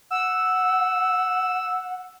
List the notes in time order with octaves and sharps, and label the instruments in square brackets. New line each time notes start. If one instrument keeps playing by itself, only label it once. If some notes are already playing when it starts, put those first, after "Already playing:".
[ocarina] F#5 [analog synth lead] E6